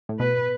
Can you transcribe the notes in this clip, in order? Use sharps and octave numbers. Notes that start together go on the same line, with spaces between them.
A2
B2 B4